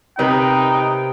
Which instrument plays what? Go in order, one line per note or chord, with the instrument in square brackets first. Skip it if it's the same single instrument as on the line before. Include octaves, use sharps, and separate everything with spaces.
[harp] C3 A#4 B4 [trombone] D#4 [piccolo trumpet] G5